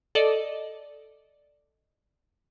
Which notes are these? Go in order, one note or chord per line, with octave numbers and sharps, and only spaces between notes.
A4 D5 D#5